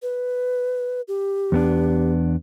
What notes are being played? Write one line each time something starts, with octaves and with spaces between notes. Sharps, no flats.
B4
G4
E2 B3 D4